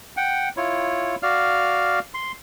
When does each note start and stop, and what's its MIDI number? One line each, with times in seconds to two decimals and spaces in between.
0.17 0.49 78
0.17 0.49 79
0.57 1.15 64
0.57 1.15 65
0.57 1.15 73
1.23 1.99 66
1.23 1.99 74
1.23 1.99 77
1.23 1.99 89
2.14 2.32 84